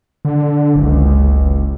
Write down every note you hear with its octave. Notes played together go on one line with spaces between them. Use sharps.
D3
F#1 C#2